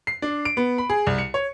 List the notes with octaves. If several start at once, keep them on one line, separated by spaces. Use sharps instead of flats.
C7
D4
D7
B3
B5
G#4
C2
C#7
C#5